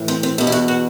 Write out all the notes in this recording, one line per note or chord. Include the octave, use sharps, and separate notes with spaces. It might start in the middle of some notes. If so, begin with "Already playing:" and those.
Already playing: A2 E3
C4
C4
E2 B2
E4
F#4
F#4